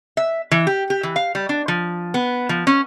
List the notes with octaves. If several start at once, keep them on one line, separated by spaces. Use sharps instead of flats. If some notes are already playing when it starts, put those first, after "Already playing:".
E5
E3
G4
G4
E3
F5
G3
D4
F3
B3
F3
C#4